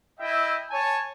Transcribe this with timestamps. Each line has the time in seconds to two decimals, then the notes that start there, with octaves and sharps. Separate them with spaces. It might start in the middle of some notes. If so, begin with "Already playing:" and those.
0.19 E4 D#5 E5 G5
0.71 C#5 G#5 A5